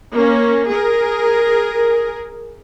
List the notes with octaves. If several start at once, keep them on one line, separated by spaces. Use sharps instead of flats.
A#3 C#4
G#4 A#4